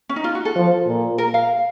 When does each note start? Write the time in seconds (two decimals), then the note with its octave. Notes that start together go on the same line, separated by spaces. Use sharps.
0.09 C#4
0.16 D#4
0.24 F4
0.35 F#4
0.45 A4
0.56 F3
0.87 A#2
1.18 A#4
1.34 F5